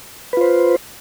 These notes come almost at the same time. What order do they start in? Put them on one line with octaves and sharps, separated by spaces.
B4 F4 C5